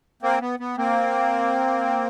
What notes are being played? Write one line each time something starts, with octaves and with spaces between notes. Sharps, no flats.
A#3 C4
B3
B3
A#3 C4